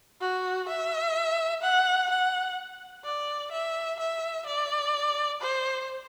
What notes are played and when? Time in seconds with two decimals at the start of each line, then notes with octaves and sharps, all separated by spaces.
0.21 F#4
0.68 E5
1.62 F#5
2.10 F#5
3.04 D5
3.52 E5
3.99 E5
4.46 D5
5.42 C5